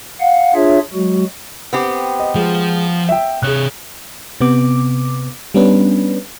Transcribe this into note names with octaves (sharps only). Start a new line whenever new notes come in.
F5 F#5
D4 F4 G#4 C#5 E5
F#3 G#3 F#4
B3 C4 G4
D#5
F3 G#3
E5 G5
C3 G#4 C#5 F#6
C3 B3 D6
G3 B3 C#4 D4 B4